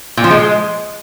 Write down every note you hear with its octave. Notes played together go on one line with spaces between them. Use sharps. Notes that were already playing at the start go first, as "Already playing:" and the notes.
A#2
F3
G#3